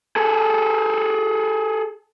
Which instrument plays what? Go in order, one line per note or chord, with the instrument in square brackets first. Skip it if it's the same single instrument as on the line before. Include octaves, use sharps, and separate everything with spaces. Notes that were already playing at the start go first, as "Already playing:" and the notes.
[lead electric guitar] G#4 A4